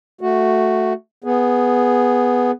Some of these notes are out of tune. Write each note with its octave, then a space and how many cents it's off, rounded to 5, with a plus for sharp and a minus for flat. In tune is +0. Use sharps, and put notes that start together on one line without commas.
A3 +0 F#4 +0
B3 +0 G#4 +0